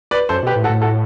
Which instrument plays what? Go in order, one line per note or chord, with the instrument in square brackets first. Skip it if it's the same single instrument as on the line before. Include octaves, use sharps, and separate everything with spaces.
[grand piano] B4 D5
[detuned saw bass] F#2 [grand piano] A4 C5
[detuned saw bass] B2 [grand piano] G4 B4
[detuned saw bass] A2
[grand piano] F#4 A4
[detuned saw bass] A2
[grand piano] F#4 A4